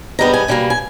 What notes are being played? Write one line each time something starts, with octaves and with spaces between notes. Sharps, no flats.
G#2 G3 B3 A#5
G#5
B2 G3 A#3
G#5